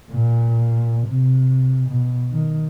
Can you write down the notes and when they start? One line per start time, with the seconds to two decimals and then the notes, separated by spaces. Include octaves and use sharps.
0.11 A#2
1.07 C3
1.89 B2
2.32 D#3